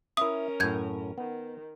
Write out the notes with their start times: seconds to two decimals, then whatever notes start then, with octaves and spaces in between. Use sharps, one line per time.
0.17 C#4 E4 A#4 E5 D#6
0.60 F#2 A2 G6 G#6
1.18 D#3 B3